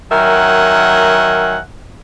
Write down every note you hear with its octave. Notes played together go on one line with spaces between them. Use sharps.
D#3 F#3 A#4 E5 F#5 G#5